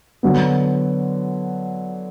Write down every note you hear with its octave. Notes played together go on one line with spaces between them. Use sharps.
D3 F#3 B3